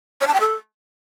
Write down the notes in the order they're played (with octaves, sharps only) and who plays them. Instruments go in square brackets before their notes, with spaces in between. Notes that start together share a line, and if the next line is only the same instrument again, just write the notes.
[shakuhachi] C#5
A5
G5
A4